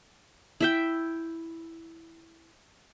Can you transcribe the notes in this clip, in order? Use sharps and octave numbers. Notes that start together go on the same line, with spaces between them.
E4 E5 G5